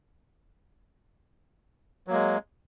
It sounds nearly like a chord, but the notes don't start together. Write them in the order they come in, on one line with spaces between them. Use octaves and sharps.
F#3 A#3 G#3